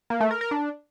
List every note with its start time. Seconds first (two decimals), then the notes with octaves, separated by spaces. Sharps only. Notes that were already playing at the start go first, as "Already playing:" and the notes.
0.10 A#3
0.20 A3
0.31 A#4
0.41 A#4
0.51 D4